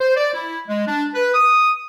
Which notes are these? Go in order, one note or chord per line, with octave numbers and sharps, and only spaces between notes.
C5
D5
E4
G#3
D4
B4
D#6